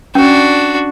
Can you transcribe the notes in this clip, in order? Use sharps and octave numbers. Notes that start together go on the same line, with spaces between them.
C#4 D4 F#4